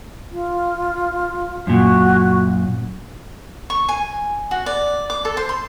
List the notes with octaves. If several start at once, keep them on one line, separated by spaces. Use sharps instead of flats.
F4
F#2 A#2 F#4
C#6
G#5
F#4
D5
D6
A4
C5
C6